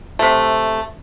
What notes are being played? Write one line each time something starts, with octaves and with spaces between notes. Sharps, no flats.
C3 A3